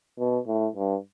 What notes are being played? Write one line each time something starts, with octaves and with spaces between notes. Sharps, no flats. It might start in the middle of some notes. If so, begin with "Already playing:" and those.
B2
A2
G2